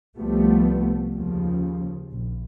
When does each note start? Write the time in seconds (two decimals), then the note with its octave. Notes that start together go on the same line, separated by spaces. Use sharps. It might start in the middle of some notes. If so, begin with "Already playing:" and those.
0.15 C2 F3 G3 A3 B3
1.15 D#2 C#3 F3
2.11 A#1